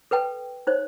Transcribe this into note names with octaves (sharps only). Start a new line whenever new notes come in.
A4 B4 G5 A5
D#4 C5 C#5